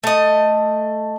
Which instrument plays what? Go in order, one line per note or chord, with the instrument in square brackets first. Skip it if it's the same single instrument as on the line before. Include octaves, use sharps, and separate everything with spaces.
[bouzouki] A3 D#5